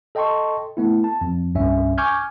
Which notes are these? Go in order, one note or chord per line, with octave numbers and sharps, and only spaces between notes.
A4 D#5 G5 A5 C6 C#6
A3 B3 E4
A5
F2
C2 G2 C#4 E5
G#5 C#6 D6 F6 G6 G#6